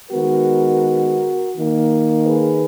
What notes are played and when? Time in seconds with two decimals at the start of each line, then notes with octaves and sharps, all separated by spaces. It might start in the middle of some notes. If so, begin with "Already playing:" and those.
0.11 D#3 G#3 B3 F#4 A#4
1.55 D#3 A#3
2.26 G#4 B4